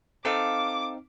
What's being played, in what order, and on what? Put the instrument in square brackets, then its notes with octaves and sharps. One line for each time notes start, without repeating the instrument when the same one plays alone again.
[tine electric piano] C4 D#4 [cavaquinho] A4 F5 [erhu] D6